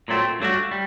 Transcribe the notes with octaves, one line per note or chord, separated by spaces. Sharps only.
A#2 F#3 A3 C4
G2 F#3 A3 D4 F#4
G3